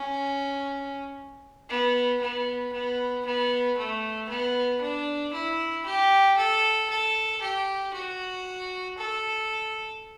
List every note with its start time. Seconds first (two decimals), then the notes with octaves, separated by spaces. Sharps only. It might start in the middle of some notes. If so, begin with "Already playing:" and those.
Already playing: C#4
1.69 B3
2.21 B3
2.73 B3
3.25 B3
3.77 A3
4.29 B3
4.81 D4
5.33 E4
5.86 G4
6.37 A4
6.89 A4
7.41 G4
7.93 F#4
8.97 A4